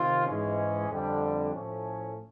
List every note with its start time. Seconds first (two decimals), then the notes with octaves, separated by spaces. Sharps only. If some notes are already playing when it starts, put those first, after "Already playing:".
Already playing: C3 D#3 C4 F4
0.26 G#2 E3 G#3 C#4
0.89 F2 D3 G3
1.53 A2 F3 A3 C#4